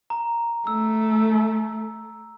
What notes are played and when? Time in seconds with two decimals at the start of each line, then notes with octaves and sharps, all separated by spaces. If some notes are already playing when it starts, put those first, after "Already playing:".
0.10 A#5
0.67 A3 E6